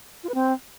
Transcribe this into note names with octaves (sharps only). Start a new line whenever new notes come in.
F4
B4
C4